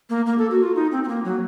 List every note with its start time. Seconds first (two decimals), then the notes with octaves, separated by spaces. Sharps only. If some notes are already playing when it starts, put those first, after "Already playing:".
0.10 A#3
0.26 A#3
0.38 A4
0.51 F#4
0.63 F4
0.76 D#4
0.92 C4
1.04 C4
1.08 A#3
1.24 F#3